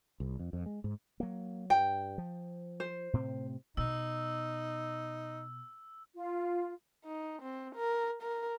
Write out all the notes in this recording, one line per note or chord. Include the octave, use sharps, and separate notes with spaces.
C2
F2
F2
G#3
G#2
F#3 A#3
G2 G5
F3
C5
A2 C3 C4
B2 D#4 E6
F4
D#4
C4
A#4
A#4